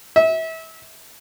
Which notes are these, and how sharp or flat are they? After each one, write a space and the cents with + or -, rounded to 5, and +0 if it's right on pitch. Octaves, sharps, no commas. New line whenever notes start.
E5 -30